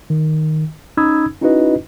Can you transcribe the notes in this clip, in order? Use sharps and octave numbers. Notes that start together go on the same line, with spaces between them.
D#3
C#4 D#4 B5 D#6 E6 G#6
C#4 D#4 E4 F#4 B4 D#5